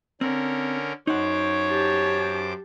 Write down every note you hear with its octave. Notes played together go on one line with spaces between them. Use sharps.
D3 C4 C#4 A#4
F#2 D#4 C5 C#5 F#5 D6
G4 A5